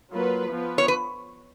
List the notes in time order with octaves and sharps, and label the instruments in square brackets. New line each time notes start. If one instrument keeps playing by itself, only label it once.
[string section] F#3 A#3 F4 B4
F3 B3 F4 B4
[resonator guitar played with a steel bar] C#5
B4